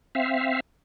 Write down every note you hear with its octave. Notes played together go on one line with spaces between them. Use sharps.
C4 E5 F5